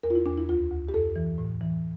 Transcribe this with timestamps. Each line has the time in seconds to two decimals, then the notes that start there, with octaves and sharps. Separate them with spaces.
0.03 E2 A#4
0.10 F4
0.15 E4
0.26 E2 D4
0.37 E4
0.49 D2 F4
0.71 D2
0.88 G4
0.94 F2 A4
1.16 E3
1.38 A2
1.61 E3